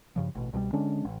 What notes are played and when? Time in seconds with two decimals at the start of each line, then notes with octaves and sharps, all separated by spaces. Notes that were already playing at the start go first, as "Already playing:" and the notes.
0.16 G2 C#3 F3
0.35 A1 B2
0.53 C2 B2 D#3 G3
0.73 D3 G#3 C#4 D4
1.05 A1